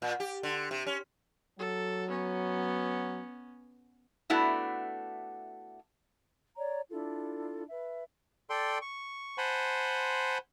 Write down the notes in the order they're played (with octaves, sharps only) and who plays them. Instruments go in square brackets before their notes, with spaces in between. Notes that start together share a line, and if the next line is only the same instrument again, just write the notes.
[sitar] A#2
G4
D3
C3
C#4
[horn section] F#3 [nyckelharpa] A4
[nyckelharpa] B3 C#4
[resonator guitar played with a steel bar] A3 B3 D4 E4 F#4
[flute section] C#5 D5 A#5
D4 E4 F4 A4
B4 E5
[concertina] A4 D5 G5 C6
C#6
C5 F#5 G#5 A5 B5 C6